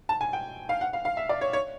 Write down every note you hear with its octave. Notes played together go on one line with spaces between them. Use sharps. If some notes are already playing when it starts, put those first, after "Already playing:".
A5
G#5
G5
F5
F#5
F5
F5
E5
D5
C#5
C#5